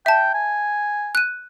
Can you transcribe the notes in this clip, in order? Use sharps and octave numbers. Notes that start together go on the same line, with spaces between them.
E5 G5 A5
G#5
F#6 D#7